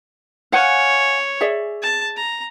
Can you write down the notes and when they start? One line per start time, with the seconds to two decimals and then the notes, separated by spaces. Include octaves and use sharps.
0.52 C#5 F5 F#5 G#5
1.41 G#4 D5 E5
1.82 A5
2.17 A#5